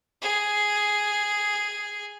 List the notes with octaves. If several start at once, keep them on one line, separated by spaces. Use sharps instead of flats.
G#4